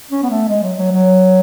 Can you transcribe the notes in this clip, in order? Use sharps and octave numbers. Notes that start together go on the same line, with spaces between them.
C#4
B3
A3
G#3
F#3
F#3
F#3